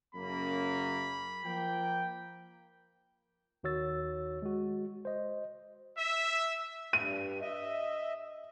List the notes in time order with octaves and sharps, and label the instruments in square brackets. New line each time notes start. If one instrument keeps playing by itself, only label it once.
[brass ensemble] F#2 C#3 A#3 [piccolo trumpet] B5
[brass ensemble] F3 A#3 G5
[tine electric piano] D#2 D#3 F#4 C#5 E6 A6
G#3 F#4
C5 D#5
[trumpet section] E5
[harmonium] G2 [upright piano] D#7
[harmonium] D#5 E5